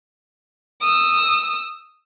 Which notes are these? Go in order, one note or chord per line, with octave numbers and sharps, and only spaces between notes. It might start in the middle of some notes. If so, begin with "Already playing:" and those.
D#6 E6